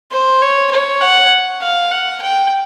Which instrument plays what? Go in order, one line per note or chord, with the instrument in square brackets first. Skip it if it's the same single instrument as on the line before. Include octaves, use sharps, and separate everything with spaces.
[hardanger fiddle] C5
C#5
C#5
F#5
F5
F#5
G5